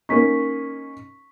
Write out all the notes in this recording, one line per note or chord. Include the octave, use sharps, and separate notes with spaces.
A#3 C#4 D#4 C#6 B6